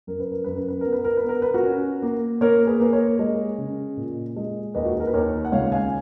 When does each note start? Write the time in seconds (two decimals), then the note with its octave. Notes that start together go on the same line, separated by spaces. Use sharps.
0.07 F#2 A#4
0.20 B4
0.32 A#4
0.44 F#2 B4
0.56 A#4
0.68 B4
0.81 A#4
0.86 B3
0.93 B4
1.04 A#4
1.17 B4
1.24 B3 A#4
1.42 B4
1.54 F#4 A#4
1.63 C#4
2.02 A#3
2.41 A#3 A#4 C#5
2.67 G#4 B4
2.80 A#3 B4
2.93 A#4 C#5
3.19 G#3
3.58 C#3
3.97 A#2
4.36 G#3
4.74 D#2 B4 D#5
4.85 F#4
4.93 G#4
5.00 A#4
5.07 B4
5.14 D#2 A#4 C#5
5.45 F#5
5.52 C#2 C#5 F5
5.72 F5 G#5